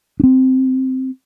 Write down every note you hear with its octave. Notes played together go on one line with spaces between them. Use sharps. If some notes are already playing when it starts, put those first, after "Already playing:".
C4 D4